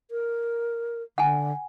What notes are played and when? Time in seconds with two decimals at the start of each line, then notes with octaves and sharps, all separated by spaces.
0.11 A#4
1.18 D3 F#5 G#5